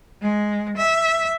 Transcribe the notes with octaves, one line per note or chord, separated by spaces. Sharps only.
G#3
E5